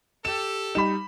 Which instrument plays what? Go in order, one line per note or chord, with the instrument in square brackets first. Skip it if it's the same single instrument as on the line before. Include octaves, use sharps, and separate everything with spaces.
[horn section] G4 A4 [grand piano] E7
[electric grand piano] G3 D#4 [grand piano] B5 E7